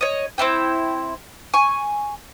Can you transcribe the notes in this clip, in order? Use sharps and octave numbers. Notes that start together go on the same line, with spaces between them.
C#5 D#5
C4 C#4 E4 G5
G#5 C#6